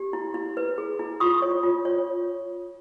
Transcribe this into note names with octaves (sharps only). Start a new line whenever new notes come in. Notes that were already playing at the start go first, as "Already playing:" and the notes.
Already playing: G4
E4
E4
B4
G#4
E4
F4 C#6 D#6
C#5
F4
C#5